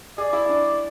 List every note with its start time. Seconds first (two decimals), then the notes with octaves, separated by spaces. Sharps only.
0.18 G#4 D5
0.33 E4
0.49 D4